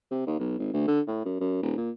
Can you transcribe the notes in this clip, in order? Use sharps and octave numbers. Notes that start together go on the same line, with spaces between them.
C3
D#2
B1
G#1
D2
D3
A2
F#2
F#2
D#1
A#2